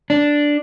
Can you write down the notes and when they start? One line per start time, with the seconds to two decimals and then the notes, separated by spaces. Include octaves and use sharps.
0.10 D4